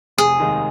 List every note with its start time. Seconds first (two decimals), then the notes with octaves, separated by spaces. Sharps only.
0.18 F1 G#4
0.39 D#2 D#3 G#3 D#4